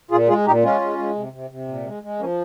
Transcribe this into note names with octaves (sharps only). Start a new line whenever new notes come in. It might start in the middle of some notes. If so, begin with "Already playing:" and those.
A#2 F4 G#4
G#3 F4 G#4
A#2 D#4 G4
G#3 C#4 F4
G#3
G#3
C3
C3
C3
A#2
G#3
G#3
F3 A#3 C#4